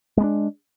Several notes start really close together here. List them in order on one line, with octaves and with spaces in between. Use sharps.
G#3 B3 D4